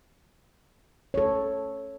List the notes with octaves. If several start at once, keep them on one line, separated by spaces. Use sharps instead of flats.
A4 C#5